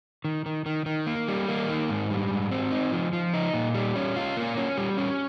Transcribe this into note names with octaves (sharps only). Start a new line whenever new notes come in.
D#3
D#3
D#3
D#3
A#3
G3
A#3
D#3
G#2
G3
G#2
C4
D#4
F3
F3
D#4
A#2
G3
C#4
F4
A#3
C#4
G3
C#4